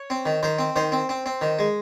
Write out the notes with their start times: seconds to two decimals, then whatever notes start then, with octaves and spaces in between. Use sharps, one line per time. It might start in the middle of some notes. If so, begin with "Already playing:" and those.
Already playing: C#5
0.10 C4
0.26 D#3
0.43 D#3 C5
0.59 C4
0.76 D#3 C5
0.92 C4
1.09 C4
1.26 C4
1.41 D#3
1.59 G#3